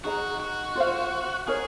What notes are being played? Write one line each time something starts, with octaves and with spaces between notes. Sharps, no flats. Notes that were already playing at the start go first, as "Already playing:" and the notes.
D#4 F#4 G#4 D#5 A#5
F#4
F4 C5 F5
D#4 G#4 A#4 C#5